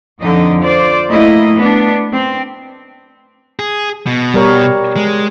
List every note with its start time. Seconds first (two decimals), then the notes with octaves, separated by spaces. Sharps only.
0.21 F2 D3 F3 D#4 D#5
0.63 F4 C5 D5
1.08 A3 A#3 E4 D#5
1.56 B3 D4
2.12 C4
3.59 G#4
4.07 B2
4.34 G3 A#4 C#5
4.96 G#3